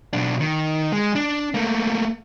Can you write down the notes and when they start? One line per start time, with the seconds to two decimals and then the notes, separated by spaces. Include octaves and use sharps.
0.13 B1 D4
0.41 D#3
0.93 G#3
1.15 D4
1.54 A3 A#3